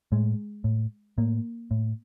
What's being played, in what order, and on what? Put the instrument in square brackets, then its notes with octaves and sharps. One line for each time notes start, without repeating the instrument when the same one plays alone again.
[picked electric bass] A2 G#3
A2
A2 A#3
A2